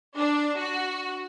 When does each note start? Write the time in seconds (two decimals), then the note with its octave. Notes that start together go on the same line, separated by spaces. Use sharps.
0.17 D4
0.58 F#4